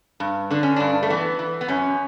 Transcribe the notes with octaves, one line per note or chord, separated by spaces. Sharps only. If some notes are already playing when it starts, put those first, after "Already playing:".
G2
D3 D4
C#4
G2 D4
A3
E3 B3
E3
B3
F#2 C#4